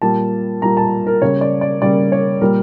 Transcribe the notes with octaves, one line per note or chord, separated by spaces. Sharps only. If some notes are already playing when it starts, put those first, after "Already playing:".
A#2 G3 A#3 A5
A#2 G3 A#3 A#5
A5
A#4
C#3 G3 A#3 C#5
D5
D5
C#3 G3 A#3 D5
C#5
A#2 G3 A#3 A#4